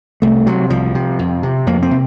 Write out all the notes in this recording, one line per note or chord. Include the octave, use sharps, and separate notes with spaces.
C2 A3
C3 F#3
C2 F3
C3
F2
C3
F2 A#3
C4
C3